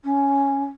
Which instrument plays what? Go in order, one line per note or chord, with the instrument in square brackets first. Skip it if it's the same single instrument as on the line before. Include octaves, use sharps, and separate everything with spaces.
[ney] C#4